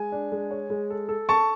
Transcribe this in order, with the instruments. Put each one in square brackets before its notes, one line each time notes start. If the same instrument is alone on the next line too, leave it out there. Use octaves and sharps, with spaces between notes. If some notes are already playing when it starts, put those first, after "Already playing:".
Already playing: [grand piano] G#3 [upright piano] G#5
[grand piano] D4
G#3
C#5
G#3
A4
A4
[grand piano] A4 [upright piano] A5 C#6